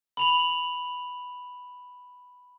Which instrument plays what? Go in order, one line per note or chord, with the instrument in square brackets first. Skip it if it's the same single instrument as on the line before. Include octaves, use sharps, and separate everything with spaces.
[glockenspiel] B5 F7 F#7